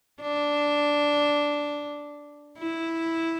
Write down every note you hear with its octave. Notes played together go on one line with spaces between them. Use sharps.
D4
E4